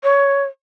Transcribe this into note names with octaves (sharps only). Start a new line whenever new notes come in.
C#5